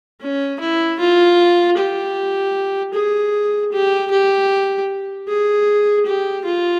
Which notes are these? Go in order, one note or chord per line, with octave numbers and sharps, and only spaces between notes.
C#4
E4
F4
G4
G#4
G4
G4
G#4
G4
F4